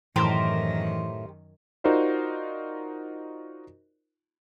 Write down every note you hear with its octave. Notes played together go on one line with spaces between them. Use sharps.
F#2 A2 D#3 E3 G4 A#4 C5
D#4 F4 F#4 A#4 C5 D5